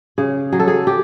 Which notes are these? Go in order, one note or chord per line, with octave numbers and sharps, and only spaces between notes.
C#3 G#4
F#3 G#4
A4
G#4
G4